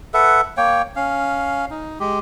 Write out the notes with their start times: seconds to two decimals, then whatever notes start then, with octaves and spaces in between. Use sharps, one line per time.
0.14 A4 B4 E5 F#5
0.57 A#3 C#5 G5
0.96 C#4 F5
1.71 D#4
2.00 G#3 G4